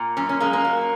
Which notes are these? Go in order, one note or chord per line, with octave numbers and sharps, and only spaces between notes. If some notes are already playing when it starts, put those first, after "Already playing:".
Already playing: A#2
F#2 C#4
C#4
G#3 A#3
A#3
F#3